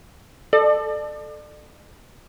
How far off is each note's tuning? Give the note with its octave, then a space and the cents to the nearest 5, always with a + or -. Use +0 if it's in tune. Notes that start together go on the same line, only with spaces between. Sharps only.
A4 -10 D5 +35